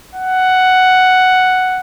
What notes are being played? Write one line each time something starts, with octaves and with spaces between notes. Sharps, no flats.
F#5